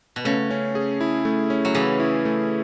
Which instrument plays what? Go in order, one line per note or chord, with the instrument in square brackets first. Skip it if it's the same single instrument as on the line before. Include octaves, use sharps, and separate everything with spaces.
[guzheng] B2
[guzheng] C#3 [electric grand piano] A3
[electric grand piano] C#4
G#4
E4
A3
C#4
[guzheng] F#3
[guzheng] C#3 E3 [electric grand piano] G#4
[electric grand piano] E4
A3